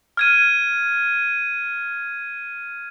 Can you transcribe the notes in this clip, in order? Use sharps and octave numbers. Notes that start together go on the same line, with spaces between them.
F6 G#6 D#7